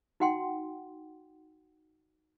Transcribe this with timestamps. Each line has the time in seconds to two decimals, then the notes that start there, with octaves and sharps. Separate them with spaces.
0.20 D#4 F#4 F#5 G5 C6